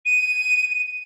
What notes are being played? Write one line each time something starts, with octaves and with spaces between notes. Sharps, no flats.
D#7